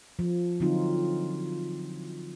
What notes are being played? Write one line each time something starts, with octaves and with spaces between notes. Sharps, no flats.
F3
D3 F#3 C4 D#4 F4